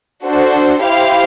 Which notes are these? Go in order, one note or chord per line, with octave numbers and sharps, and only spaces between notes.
D4 F#4 A4 C5
E4 G4 C5 F5